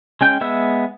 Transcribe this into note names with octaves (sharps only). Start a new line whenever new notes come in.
G#3 C#4 G5 G6
G#3 B3 E5 E6